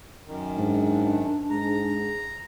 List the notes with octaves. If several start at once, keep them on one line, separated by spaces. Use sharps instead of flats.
F#2 D#3
G#2 D4
G#2 G#3 A#5